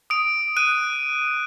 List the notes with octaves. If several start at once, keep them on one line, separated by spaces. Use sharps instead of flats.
D#6 D7
F#6 D#7